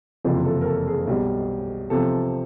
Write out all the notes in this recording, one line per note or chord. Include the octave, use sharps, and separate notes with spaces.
F#1 F2 C3 E3 F4
A4
A#4
A4
G#4
B1 B2 G3
E2 C3 F3 A4